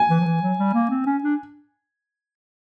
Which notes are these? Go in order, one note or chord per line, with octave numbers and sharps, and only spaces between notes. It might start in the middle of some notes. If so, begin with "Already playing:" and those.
Already playing: G#5
E3
F3
E3
F#3
G3
A#3
C4
C#4
D4